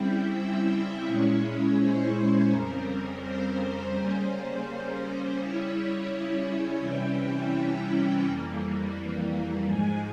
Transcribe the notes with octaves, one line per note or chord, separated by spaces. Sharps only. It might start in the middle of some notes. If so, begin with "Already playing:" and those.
Already playing: C#3 G3 C4 E4 G5
E5
A#2 G#3 C#4 E4 C#5
C5
F2 C#3 G3 C4 A#4
C5
C#3 G3 A#3 C#4
C#3 G3 C#4 E4 C#5
C3 E3 G3 C#4 E4 G5
F2 E3 G3 A#3
G#2 F3 G#3 G#5